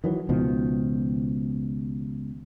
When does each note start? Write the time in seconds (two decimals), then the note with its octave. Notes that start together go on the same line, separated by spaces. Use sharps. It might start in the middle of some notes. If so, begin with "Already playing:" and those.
0.04 D#3 E3 F#3
0.29 C#2 B2 D#3 F3